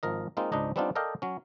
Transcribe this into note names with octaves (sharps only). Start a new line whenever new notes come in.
G#1 F3 A#4 D#5
G#3 A#3 C4 D#4 F4
C#2 G#2 D4 D#4 D#5
G3 B3 C4 D4 D#4 F4
A4 A#4 D5 D#5 F5 G5
F#3 C#4